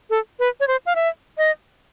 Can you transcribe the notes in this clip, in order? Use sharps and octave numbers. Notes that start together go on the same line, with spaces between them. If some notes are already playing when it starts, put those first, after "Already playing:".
A4
B4
C#5
C5
F5
E5
D#5